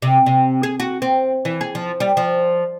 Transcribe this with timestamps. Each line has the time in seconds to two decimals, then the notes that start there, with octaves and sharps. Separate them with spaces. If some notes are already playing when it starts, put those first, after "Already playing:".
0.02 C3
0.26 C3
0.63 G#4
0.80 F#4
1.02 C4
1.45 E3
1.61 G#4
1.75 F3
2.00 G3
2.17 F3